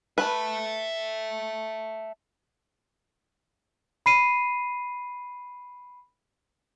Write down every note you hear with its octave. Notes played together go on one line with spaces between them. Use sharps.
B4 E5 A5
B5 C7 D#7